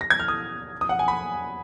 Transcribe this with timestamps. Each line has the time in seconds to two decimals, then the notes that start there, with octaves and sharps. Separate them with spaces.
0.01 A#6
0.10 G#6
0.20 F6
0.28 D#6
0.81 D#6
0.89 F#5
0.99 G#5
1.08 B5